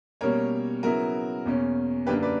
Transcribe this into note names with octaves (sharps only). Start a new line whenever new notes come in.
B2 G3 A#3 C#4 A#4 C#5
C#3 F#3 B3 E4 F#4 A#4
E2 B2 A#3 C#4
F#2 D3 A#3 D4 G4 B4
B4 D5